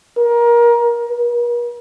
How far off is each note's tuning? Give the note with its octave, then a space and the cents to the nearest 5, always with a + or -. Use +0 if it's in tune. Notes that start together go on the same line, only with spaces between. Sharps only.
A#4 +25
A#4 +45